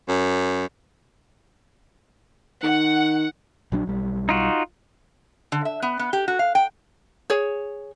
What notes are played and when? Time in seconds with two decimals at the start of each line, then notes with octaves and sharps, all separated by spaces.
0.08 F#2
2.63 D#3 F#5
3.72 A#1 F#3 D4
3.87 B1 G3
4.29 D#4 F4 F#4
5.52 D3
5.65 E5
5.82 B3
5.99 B3
6.13 G4
6.28 F#4
6.39 F5
6.55 G5
7.30 G#4 C#5